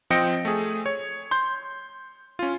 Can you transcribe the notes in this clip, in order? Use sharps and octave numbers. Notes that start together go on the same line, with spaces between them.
F3 C4 D#5 G5 A#6 C#7
A3 G#4
C#5
C6 G6
C#4 F4